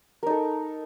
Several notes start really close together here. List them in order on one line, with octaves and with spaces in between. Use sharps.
A#4 D#4 A4